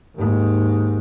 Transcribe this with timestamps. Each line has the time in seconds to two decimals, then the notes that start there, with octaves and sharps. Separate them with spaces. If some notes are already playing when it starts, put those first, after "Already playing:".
0.16 D#2 G#2